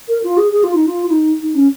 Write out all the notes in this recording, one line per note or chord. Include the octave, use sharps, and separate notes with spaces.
A#4
F4
G#4
G#4
F4
D#4
F4
F4
D#4
D#4
C#4